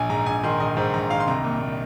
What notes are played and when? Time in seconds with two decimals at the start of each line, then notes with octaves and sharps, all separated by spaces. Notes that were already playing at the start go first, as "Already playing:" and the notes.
Already playing: A#1 G#5
0.09 G#2 A#5
0.26 A#1 G#5
0.43 D#3 C6
0.60 A#1 D#5
0.77 G#2 C5
0.93 A#1 A#5
1.10 D#3 F5
1.20 C6
1.27 C2 A#5
1.44 A#2
1.61 A#2